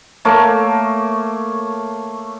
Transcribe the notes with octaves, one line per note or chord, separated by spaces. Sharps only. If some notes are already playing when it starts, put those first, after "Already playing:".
A3 A#3 C#5